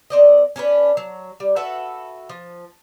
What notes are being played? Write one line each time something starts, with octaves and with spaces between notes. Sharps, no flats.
C4 D5 D#5
C#4 D4 A4 B4
F#3
G3
F#4 A4 B4 E5
F3